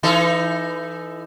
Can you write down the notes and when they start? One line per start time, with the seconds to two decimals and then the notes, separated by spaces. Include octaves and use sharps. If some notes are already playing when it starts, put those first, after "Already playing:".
0.03 E3 D#4 A4